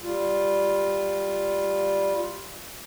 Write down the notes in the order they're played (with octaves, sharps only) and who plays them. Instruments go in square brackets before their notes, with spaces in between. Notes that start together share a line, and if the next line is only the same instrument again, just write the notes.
[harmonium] G3 F4